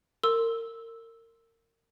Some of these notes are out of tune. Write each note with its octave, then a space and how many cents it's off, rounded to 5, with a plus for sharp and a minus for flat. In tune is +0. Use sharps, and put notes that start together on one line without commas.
A#4 -30 C6 +0 E6 -5